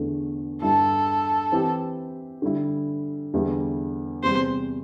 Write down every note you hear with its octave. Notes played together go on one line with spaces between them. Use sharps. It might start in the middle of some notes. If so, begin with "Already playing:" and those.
Already playing: E2 D3 A3
G2 G3 E4 G4 A4
E3 C4 E4 G4
D3 G3 E4
E2 D3 G3 E4
E2 C3 G3 C5